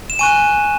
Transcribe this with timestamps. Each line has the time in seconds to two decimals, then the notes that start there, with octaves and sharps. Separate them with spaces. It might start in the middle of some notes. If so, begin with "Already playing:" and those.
0.10 E7
0.19 G#5 C#6 F#6 D#7